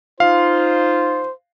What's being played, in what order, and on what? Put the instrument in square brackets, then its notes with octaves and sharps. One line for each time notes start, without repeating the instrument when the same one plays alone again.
[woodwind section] D#4 F4 [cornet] C5 [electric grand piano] F5